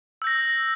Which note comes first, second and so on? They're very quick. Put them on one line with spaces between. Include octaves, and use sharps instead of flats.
E6 G6 A#6